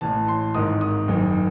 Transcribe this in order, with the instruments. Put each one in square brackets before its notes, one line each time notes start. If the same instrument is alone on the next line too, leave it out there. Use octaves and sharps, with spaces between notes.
[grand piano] A1 A2 E3 A5
C6
G#1 G#2 D#3 D#6
D#6
F#1 F#2 D#3